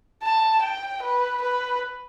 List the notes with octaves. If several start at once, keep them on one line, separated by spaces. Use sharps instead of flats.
A5
G5
B4
B4